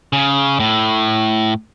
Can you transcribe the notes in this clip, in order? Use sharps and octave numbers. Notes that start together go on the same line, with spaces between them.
C#3
A2